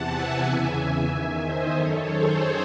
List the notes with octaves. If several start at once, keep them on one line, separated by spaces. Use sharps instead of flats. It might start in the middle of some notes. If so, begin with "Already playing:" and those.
Already playing: E2 C3 E3 F#5 A5
E5 G#5
E2 C#3 E3 E5 G#5
E2 D#3 E5 G#5
C5 D#5
F#2 D#3 A4 C#5
G#4 C5